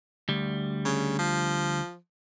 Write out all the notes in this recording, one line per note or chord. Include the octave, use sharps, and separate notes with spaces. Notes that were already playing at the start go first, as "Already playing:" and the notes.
D2 G3
C#3
F3